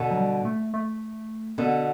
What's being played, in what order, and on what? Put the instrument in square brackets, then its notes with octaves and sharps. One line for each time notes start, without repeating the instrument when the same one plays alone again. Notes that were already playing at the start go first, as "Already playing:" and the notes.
Already playing: [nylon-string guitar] B2 D3
[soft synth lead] F#3
G3
A3
A3
[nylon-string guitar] B2 D3 [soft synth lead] B3